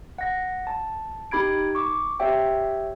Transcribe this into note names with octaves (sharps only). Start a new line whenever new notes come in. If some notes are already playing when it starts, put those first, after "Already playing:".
F#5 A#6
A5
D#4 G4 B5 G#6 D7
C#6 D6
G4 C#5 E5 G5